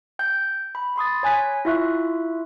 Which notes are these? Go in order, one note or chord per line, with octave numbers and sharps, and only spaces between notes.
G5 G6
B5
B5 C6 D#6 A6
C#5 G#5 F#6 B6
E4 F4 E5 C#6 F#6